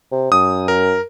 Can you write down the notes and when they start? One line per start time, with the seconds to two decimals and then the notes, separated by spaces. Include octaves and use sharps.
0.11 C3
0.32 F#2 D#6
0.68 A#4